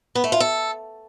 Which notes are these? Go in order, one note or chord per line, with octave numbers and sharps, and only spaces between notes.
B3
A3
F4
A4